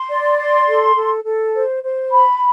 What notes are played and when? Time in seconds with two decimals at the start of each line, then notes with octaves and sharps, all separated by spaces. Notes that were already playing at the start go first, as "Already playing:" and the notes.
Already playing: C6
0.10 D5
0.38 C6
0.68 A4
0.96 A4
1.24 A4
1.55 C5
1.83 C5
2.11 B5